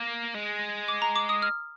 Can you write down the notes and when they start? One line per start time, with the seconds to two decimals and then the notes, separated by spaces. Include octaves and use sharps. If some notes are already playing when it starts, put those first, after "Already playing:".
Already playing: A#3
0.35 G#3
0.88 D6
1.02 A#5
1.16 D6
1.29 D#6
1.42 F6